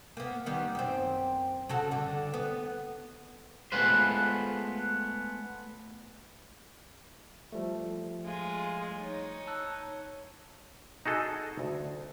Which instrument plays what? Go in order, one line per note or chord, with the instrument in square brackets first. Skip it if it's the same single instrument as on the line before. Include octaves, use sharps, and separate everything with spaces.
[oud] A#3 B3
D#3 G3 B3
F#2 C4
C#3 F#4 A4
G2 D3
B3
[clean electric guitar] G#3 A3 B3 F4 B4 C5
[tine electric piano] F3 G3 A3
[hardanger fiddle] G#3 F4
D#4 C#5
[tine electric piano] A5 E6 F#6
[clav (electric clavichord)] D#4 F#4 G#4 A4 D#5
D2